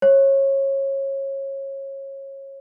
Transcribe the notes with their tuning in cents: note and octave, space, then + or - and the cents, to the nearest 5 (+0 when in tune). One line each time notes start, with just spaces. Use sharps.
C#5 -25